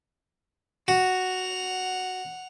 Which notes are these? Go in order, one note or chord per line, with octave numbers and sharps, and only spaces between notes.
F#4 F#5 F7